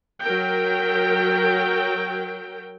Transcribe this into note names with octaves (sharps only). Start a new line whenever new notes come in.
F#3 A#4 G5